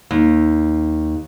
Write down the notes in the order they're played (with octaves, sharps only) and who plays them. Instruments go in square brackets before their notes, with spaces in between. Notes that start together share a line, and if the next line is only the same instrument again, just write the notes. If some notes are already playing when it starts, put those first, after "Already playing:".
[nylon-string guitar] D#2